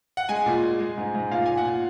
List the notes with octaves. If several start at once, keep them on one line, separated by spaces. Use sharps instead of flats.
F#5
G#3 G#5
A#2
G#3
G#3
G#2
G#2
A#2 F5
A#2 G#5
F#5
A#2